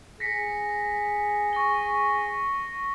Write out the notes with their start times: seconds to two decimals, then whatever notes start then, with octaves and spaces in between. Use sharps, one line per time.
0.20 G#4 A#6 B6 C#7
1.53 C#6 A#6 G7